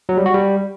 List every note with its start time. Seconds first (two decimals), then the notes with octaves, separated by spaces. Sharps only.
0.09 F#3
0.17 G3
0.26 F#4
0.34 G3